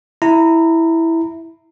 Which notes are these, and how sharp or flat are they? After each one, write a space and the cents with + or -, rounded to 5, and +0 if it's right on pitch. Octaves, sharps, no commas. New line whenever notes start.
E4 -5 A#5 -20